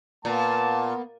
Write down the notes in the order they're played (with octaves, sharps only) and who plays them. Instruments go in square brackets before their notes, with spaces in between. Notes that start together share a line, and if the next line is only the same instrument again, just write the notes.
[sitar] A#2 [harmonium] A#3 B3 [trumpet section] A5